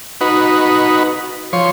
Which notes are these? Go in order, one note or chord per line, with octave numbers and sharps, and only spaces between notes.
D#4 F#4 B4
F3 C#5 C6